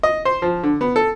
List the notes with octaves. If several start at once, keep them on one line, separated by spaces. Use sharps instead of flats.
D#5
C5
F3
D3
B3
A4